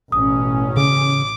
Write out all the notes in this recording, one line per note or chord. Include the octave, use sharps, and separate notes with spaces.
A1 B2 C#4 D#6
C#3 D6